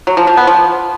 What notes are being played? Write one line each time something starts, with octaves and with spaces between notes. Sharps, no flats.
F#3
F3
F3
B3
F3